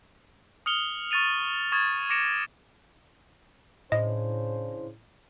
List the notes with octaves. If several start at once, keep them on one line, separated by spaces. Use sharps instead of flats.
D#6 F6 C#7 F7 G7
C#6 F6 A6 D#7 F7
C#6 D#6 G#6 A6
D6 A#6 C#7 D7 E7
A2 C#3 D4 C5 D#5